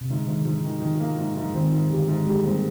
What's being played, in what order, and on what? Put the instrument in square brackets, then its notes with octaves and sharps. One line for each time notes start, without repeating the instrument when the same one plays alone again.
[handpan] C3
[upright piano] G#2 [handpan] D3
[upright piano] G#2 [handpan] D#3
[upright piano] G#2 [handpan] F3
[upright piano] D#3
[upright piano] D#3 [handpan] F3
[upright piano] A#3
G#2
G#2
[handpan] F3
[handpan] D#3 [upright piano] C4
[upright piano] G#2
[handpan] D3 [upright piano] G3
[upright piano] G#2
[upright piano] G3 [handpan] G#3
[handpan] G3 A#3 [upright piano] C4